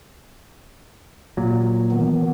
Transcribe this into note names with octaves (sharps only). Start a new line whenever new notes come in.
A#2 F#3
D#3 E3 B3